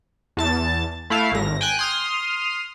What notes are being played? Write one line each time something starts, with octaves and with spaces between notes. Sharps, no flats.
E2 A5 A6
A3 E4 F5
G#1 A#6
G5 G#5 F#6
C6 D#6 F6